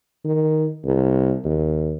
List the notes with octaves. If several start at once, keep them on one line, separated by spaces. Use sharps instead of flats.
D#3
C2
D#2